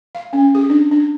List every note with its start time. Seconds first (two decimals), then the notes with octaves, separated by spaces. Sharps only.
0.15 F5
0.33 C#4
0.55 G#4
0.70 D4
0.91 D4